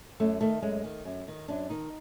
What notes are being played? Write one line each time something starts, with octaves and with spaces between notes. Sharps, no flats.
F#2 A3
D#3 A3
F#2 G#3
D#3
F#2
D#3
F#2 D4
D#3 D#4